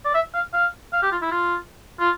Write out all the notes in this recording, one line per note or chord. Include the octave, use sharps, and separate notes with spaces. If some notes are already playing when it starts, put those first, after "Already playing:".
D5
E5
F5
F5
F5
G4
F4
E4
F4
F4